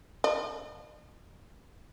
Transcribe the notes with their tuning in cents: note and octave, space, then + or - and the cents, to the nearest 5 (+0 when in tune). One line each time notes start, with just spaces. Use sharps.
D#5 -45